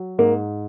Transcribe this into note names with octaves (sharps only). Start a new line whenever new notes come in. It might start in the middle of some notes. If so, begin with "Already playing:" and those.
Already playing: F#3
G#2 A#3